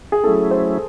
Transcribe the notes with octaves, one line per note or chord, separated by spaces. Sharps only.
G#4
F#3 A3 C#4 E4 A4
C5